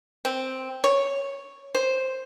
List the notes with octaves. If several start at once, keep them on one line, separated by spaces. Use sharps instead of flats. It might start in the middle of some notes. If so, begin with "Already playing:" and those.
C4
C#5
C5